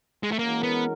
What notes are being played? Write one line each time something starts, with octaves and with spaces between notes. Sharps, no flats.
G#3
A3
E3 G#3 A#3 C#4 F#4 A#4
B3